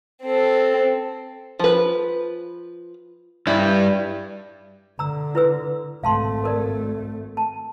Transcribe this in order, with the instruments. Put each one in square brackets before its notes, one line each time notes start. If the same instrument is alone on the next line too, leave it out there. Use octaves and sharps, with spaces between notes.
[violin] C4 A4
[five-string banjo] F3 B4
[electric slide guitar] G2 G3 [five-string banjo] E4
[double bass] D3 [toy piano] A#5 E6
[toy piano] E4 B4 E6
[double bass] G#1 A3 [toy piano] F5 A5 C6
[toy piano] A4 A#4 D5
A5